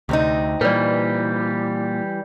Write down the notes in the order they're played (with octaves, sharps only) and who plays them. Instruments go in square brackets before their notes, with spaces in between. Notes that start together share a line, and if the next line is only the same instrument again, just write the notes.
[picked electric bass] D2 [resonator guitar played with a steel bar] C3 C4 D#4
[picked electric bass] A#2 [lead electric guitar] E3 G3 [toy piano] B4 D5